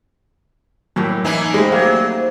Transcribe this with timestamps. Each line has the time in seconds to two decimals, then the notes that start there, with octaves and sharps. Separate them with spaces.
0.96 F#2 A2 G3 A#3 C#4
1.25 E3 A#3 D4 D#4 B4
1.54 C#3 G#3 A3 C4 C5
1.72 F#3 G3 A#3